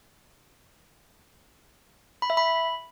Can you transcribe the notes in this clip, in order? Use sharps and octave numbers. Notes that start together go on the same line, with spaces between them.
B5
E5
B5